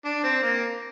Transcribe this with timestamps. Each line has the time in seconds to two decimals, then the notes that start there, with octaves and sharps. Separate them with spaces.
0.05 D4
0.24 C4
0.43 A#3